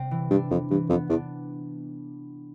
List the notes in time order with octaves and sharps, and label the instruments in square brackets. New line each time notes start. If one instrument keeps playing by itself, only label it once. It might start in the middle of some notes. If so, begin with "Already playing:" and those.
Already playing: [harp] C3 G3 C4
E3
[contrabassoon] G2 [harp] D4
[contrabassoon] F2 [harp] E3
[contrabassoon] G2 [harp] E3
[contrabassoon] F2 [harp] B3
[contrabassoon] E2 [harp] D4